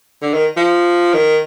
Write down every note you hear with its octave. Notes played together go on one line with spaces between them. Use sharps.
D3
D#3
F3
D#3